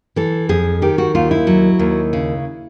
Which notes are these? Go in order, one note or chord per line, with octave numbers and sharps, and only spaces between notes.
E3 A4
F2 G#4
D#3 G4
F#4
D#2 F4
E4
F#3
D#2
C#3